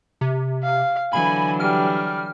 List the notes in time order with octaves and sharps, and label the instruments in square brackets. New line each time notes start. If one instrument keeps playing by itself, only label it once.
[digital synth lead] C3
[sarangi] F5
[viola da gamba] D3 E3 F#3 [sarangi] G#5 [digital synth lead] B5
[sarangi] G3 [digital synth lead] F6